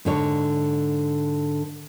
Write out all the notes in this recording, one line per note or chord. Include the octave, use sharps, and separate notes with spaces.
G#2 D3 C#5